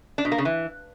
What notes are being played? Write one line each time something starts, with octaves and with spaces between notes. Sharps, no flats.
D4
B2
A#3
C#3
E3